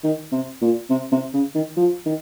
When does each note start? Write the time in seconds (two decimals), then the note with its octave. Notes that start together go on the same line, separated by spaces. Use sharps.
0.04 D#3
0.32 C3
0.62 A#2
0.90 C3
1.12 C3
1.34 C#3
1.55 D#3
1.77 F3
2.06 D#3